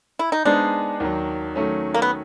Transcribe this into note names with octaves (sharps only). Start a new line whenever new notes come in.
E4
D#4
G#3 B3 D4 D#4 G#4 C5
D#2 D#3 F#3
D#3 F#3 A3 C#4
A#3
B3